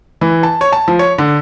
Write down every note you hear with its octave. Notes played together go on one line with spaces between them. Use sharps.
E3
A5
C#5
A5
F3
C#5
D3